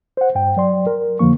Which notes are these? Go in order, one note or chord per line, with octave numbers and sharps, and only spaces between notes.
C5 F#5
G2 G5
F#3 D5 C6
A#4
F2 D3 F3 A#3 C#6